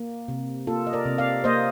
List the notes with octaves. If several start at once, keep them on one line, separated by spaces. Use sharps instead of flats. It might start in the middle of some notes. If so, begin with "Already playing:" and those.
Already playing: A#3
C3
A#3 F4 A4
D#5
A#4 D5
C3
D5 F5
A#3 C5 D#5